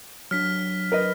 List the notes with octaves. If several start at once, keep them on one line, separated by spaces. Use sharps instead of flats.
F#3 D4 F6 B6
A#4 B4 D#5